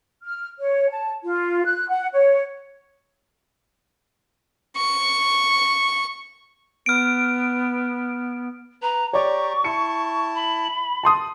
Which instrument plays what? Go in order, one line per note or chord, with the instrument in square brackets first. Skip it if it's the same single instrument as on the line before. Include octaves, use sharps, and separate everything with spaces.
[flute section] F6
C#5
A5
F4
F#6
F#5
C#5
[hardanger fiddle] C#6
[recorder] B3 [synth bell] F6 D7
[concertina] B4 [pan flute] A#5
[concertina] G4 A#5 [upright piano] C#5 D5 [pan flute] C#6
[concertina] E4 A5 [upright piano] C#7
[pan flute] B5
[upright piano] A5 C6 D#6